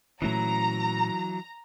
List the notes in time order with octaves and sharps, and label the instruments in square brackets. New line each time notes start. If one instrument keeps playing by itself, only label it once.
[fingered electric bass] A#2 A3 C#4 [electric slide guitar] E3 F#3 [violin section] A#5